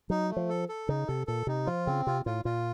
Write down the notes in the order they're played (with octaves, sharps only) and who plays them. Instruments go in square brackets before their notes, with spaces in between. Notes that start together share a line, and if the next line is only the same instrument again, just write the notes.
[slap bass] F#3 [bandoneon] D#4
[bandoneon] A3
[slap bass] F3
[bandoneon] A4
A4
[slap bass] C#3 [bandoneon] D#4
[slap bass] C3 [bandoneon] A4
[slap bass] A#2 [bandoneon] A4
[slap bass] C3 [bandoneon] D#4
[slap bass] F3 [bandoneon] F4
[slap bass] C#3 [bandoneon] C4
[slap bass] C3 [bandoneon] F4
[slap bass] A2 [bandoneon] F4
[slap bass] A#2 [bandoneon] F4